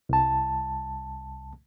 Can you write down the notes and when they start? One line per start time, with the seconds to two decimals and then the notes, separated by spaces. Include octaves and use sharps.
0.09 C2 A5